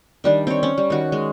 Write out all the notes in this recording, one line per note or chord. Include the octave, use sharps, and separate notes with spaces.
D#3 G3 D4
C4 C#5
C#4
G3
D#3 F#4
G#3